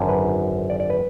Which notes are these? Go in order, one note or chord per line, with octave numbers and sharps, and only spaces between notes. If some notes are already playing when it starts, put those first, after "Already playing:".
Already playing: G#1 F#2 D3 F#3
B4
D5
D5
B4